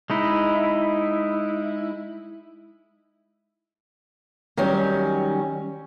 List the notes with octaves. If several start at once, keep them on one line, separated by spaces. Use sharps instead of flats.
G#3 D#4 E4
D#3 F#3 G3 C#4